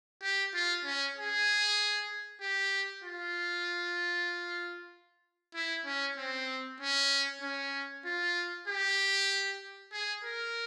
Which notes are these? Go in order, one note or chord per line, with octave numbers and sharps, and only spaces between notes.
G4
F4
C#4
G#4
G4
F4
E4
C#4
C4
C#4
C#4
F4
G4
G#4
A#4